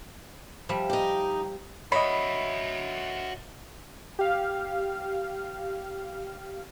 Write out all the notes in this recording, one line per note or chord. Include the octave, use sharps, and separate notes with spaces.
F3 G3 E5
D#4 G4
F#4 C#5 D#5 E5 B5
G4 F5